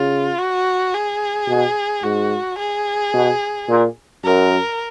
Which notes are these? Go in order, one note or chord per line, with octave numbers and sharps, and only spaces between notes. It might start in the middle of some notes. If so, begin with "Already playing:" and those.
Already playing: C#3 F4
F#4
G#4
B2
G#2 F#4
G#4
B2
A#2
F#2 A#4